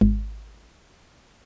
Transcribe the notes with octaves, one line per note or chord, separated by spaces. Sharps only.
G#1